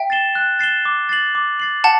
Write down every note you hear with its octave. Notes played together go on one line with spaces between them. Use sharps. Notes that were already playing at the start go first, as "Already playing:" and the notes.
Already playing: E5 G5
A6 C7 E7 G7
F#6
A6 C7 E7 G7
D6
A6 C7 F#7
D6
A6 C7 F#7
F#5 A5